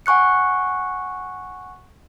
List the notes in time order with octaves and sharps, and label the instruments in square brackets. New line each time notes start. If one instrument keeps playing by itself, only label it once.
[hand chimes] F#5 G#5 C#6 F#6 C#7